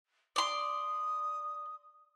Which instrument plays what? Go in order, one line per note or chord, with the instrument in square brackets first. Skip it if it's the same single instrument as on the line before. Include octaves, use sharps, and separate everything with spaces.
[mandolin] D5 C6 [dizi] D#6